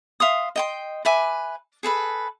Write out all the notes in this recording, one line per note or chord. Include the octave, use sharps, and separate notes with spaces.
E5 F5 C6 D#6
D#5 G5 C6
B4 E5 G#5 D6
G#4 A4 B4 B5